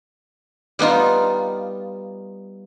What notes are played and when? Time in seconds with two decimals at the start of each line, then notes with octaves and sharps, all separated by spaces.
0.79 G3 B3 D#4 F4